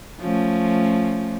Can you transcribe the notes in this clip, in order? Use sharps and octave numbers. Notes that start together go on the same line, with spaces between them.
F3 A3 C#4